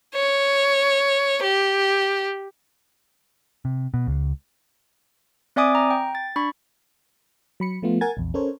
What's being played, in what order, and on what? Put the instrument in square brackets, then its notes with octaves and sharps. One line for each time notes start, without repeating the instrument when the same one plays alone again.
[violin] C#5
G4
[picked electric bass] C3
B2
C#2
[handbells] C4 D5 E5 G#5 D6 D#6
A#5
G5
A6
D4 B5 C#6
[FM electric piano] F#3 B5 C#7
F3 A3 B3 F4
A#4 F#5 G#5 G#6 A6
A#1 E2
C#4 A4 A#4 C5 C#5